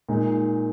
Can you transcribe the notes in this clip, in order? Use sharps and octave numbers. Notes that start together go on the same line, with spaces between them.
A#2 G#3 D#4